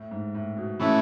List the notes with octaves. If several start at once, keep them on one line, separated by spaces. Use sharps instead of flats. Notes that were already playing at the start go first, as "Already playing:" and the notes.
Already playing: A2
G#2
A2
B2
B2 E3 A3 C#4 E4